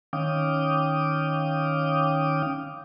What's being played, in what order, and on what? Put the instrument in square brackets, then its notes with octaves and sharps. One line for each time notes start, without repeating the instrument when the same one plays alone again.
[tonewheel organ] D#3 C#4 F5 G5 D6 D#6